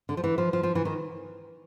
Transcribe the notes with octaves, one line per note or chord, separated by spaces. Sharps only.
D3
F3
E3
F3
F3
F3
E3
D#3